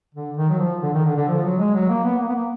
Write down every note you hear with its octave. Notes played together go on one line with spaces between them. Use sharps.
D3
D#3
F#3
F3
D3
D#3
D3
D3
F3
F#3
G#3
F#3
A#3
B3
A#3
B3
A#3